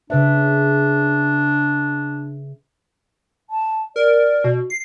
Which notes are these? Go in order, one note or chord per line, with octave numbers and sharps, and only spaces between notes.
C#3 D4 B4 E5
A5
A#4 D5
B2
C7